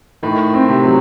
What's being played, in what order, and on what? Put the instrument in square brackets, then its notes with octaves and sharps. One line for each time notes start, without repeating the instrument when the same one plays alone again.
[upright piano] A2 [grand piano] D#3
[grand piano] C4
[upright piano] C3
[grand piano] F#3